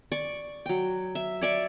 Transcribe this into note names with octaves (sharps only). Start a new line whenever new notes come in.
D5 C#6
F#3 G5
E5
C#5 D5 E5